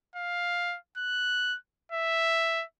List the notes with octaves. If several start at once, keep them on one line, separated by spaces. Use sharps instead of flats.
F5
F#6
E5